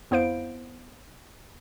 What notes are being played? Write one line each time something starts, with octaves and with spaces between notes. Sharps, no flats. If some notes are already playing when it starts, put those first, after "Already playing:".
F2 B3 E4 C5 F5 D7